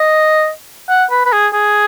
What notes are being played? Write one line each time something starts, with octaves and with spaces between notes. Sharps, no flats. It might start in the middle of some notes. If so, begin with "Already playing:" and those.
Already playing: D#5
F#5
B4
B4
G#4
G#4